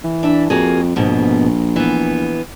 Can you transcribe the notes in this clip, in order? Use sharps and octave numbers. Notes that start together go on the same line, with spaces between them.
E3
D4 E5
F2 A#3 F#4 G#4
A#1 G#2 B2 B3
E3 B3